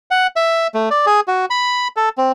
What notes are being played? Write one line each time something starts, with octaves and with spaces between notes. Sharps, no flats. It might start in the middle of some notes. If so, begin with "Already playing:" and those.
F#5
E5
A3
D5
G#4
F#4
B5
A4
C4